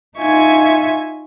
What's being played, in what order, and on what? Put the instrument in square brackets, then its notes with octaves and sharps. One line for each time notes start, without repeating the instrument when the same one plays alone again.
[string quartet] D#4 F4 E5 G#5 C#6 G#6